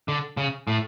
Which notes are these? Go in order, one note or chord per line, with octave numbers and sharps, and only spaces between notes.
D3
C#3
A2